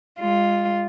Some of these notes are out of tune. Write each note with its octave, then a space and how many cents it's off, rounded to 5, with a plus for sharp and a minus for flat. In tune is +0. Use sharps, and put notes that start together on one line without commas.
G#3 -40 F4 +0